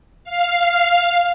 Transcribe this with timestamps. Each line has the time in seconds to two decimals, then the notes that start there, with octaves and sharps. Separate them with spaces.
0.24 F5